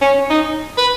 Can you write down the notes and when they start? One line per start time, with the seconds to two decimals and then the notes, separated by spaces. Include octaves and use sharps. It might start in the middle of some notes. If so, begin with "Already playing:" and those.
0.01 C#4
0.30 D#4
0.78 B4